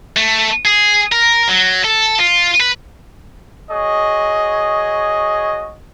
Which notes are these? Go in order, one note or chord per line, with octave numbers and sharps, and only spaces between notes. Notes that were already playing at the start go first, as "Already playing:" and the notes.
A3
G#4
A#4
F#3
A4
F4
B4
F#4 G#4 C#5 D#5